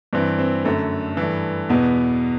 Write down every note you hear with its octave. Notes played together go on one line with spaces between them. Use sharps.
G2 E3 C4
C4
F#2 D3 A3
G2 E3
E2 B2 B3